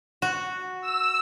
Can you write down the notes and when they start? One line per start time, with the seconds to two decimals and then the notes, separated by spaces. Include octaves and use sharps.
0.22 F#4
0.81 E6